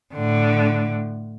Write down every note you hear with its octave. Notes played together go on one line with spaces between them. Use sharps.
A2 D3